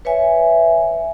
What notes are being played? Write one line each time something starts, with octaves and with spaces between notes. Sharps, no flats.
B4 C#5 E5 G#5